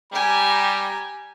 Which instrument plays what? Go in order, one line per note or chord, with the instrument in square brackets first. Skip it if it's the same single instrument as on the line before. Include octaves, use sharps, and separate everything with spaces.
[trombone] G3 [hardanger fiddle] G4 G#5 [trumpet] A#5